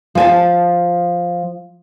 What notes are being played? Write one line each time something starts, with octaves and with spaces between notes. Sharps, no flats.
F3 G#5 A5